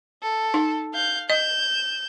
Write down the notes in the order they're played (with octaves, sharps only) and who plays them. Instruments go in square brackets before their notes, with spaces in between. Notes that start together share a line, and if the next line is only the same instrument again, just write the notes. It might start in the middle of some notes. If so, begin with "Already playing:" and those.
[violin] A4
[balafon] D#4
[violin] F5 G6
[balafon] D#5 [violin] G6 E7